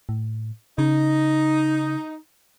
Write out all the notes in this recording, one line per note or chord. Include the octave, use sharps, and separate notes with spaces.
A2
C#3 D#4